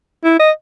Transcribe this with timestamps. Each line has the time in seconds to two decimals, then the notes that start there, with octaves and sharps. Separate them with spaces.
0.24 E4
0.39 D#5